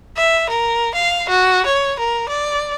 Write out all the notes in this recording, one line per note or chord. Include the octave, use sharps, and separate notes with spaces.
E5
A#4
F5
F#4
C#5
A#4
D5